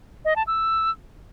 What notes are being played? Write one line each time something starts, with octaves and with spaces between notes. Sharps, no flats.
D#5
A5
E6